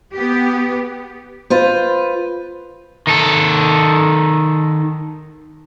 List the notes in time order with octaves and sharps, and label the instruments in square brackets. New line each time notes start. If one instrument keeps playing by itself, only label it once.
[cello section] B3 G4
[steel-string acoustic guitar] F4 B4 C5
[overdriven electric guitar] D#3 A4